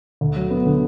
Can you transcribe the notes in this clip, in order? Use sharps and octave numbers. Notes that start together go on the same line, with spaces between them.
D2
F#3
B3
D3